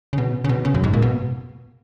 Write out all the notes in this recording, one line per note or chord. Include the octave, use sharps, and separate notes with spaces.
C#3
B2
C#3
B2
C#3
F#2
G#2
A#2
B2